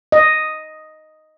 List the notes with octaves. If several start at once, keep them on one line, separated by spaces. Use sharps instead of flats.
D#5